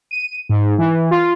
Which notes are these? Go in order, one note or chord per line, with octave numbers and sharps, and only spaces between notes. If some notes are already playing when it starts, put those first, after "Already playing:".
D#7
G#2
E3
F4